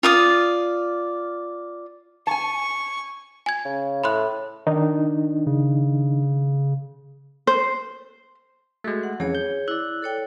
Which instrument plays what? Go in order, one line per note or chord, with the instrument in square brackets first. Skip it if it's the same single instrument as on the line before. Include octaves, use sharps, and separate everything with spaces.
[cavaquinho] F4 D5 D#6
[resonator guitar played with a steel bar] G#5 A5 [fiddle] C#6
[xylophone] G#5 G#6
[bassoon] C#3
[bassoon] A2 [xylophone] B5 C6 F#6
[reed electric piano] D#3 D4 D#4
[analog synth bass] C#3
[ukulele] C5
[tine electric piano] G#3 A3 [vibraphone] F#4
[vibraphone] F#5
[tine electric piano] F2 E3 C#4 [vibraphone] G#4 C#5
[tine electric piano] G6
[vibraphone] E4 [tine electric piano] D5 F#6
[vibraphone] A4 C#5 G5